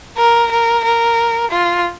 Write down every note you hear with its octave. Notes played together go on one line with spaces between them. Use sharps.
A#4
A#4
A#4
F4